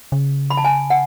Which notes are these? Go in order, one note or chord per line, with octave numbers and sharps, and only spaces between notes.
C#3
B5
A5
G#5
F#5